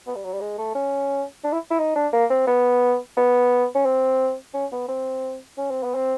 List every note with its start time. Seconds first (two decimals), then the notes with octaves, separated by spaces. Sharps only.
0.07 B3
0.15 G3
0.24 F#3
0.33 G3
0.41 G#3
0.58 A3
0.75 C#4
1.44 D4
1.52 E4
1.71 E4
1.79 D#4
1.95 D4
2.13 A#3
2.30 C4
2.47 B3
3.17 B3
3.75 C#4
3.85 C4
4.54 C#4
4.72 B3
4.88 C4
5.57 C#4
5.70 C4
5.83 B3
5.95 C4